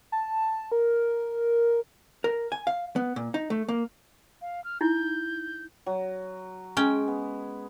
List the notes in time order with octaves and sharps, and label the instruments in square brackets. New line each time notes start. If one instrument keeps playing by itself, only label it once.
[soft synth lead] A5
A#4
[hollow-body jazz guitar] A#4
G#5
F5
B3
A#2
D#4
A3
A#3
[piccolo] F5
F6
[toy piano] D#4 E4 [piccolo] G6
[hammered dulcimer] F#3
[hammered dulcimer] G#3 [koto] C#4 G5
[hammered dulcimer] B3